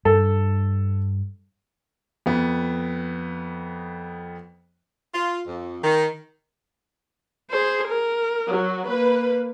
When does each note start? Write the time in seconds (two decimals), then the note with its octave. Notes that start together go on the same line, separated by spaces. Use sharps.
0.05 G2 A4
2.26 F2 B3
5.14 F4
5.48 F2
5.84 D#3
7.50 G#4 C5
7.88 A#4
8.49 F#3
8.87 A#3 B4